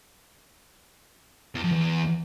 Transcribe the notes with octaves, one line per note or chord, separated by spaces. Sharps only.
E2
F2
E2